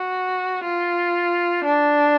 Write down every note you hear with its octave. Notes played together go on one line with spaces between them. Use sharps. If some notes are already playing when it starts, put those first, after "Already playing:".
Already playing: F#4
F4
D4